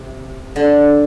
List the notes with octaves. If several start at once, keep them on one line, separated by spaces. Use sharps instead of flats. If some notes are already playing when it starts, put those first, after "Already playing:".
Already playing: C3
D3